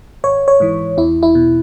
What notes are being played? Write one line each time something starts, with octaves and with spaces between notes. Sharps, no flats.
G#1 C#5
C#5
G#2 E3
E2 E4
E4
B2